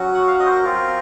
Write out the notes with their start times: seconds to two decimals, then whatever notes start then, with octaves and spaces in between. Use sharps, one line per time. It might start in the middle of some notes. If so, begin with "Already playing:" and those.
Already playing: F#3 C#4 F#4
0.14 F#5
0.27 F5
0.40 D#5
0.46 C5
0.52 A#4
0.64 C4 F4